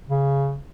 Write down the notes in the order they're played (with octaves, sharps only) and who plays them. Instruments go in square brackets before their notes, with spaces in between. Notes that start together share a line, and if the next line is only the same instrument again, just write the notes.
[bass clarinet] C#3